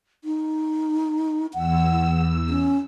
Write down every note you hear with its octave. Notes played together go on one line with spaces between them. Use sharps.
D#4
E2 F#5 E6
C#4